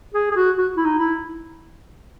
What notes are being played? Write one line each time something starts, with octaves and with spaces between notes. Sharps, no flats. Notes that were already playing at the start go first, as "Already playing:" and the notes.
G#4
G#4
F#4
F#4
E4
D#4
E4